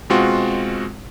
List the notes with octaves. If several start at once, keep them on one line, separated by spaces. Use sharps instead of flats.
B2 G#3 C4 F4 F#4